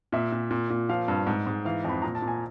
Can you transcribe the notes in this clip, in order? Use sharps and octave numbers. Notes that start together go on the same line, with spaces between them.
A#2 E5
A#2
A#2
A#2
F3 F5
G2
G#2
G#2
E3 F5
F2 B5
A#2 A#5
A5
A#2
G#5